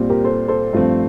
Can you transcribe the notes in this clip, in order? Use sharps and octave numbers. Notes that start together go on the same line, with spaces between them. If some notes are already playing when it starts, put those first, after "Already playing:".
Already playing: A#2 G3 C4
G4 A#4
A4 C5
A4 C5
G2 F3 A3 C4